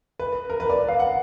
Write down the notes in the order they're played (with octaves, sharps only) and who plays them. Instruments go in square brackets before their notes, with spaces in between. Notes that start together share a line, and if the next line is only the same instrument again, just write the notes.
[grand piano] B4
A#4
B4
D5
F5
F#5